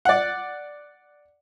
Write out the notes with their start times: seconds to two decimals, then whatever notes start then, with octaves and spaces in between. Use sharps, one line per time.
0.05 D5 F#5